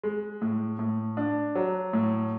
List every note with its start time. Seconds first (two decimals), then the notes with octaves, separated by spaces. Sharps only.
0.03 G#3
0.42 A2
0.79 A2
1.17 D4
1.55 F#3
1.93 A2